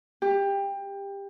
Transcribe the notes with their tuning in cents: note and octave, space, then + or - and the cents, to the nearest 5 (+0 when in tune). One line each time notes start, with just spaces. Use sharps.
G4 +20